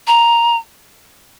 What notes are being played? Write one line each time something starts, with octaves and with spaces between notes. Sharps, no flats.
A#5